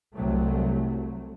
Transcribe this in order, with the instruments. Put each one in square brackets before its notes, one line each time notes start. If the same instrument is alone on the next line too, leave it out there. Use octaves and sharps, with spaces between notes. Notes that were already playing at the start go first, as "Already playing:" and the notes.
[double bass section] C2 C3 F#3 A3